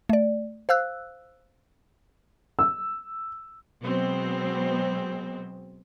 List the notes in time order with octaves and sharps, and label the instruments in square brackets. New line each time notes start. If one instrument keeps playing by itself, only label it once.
[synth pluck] A3 D5
C5 F5 E6 F#6
[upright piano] E6
[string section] B2 F#3 G#3 B3 C4